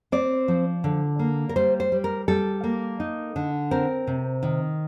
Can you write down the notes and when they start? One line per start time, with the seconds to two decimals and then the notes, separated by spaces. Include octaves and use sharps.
0.12 C4 D5
0.48 F3
0.84 D3
1.19 A#3
1.49 A#4
1.56 G3 C5
1.80 C5
1.92 G3
2.04 A#4
2.28 G3 A4
2.64 A#3
3.00 D#4
3.36 D3
3.71 C4 A#4
4.07 C3
4.43 D#3